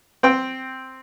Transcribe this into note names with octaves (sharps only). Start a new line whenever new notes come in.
C4 G5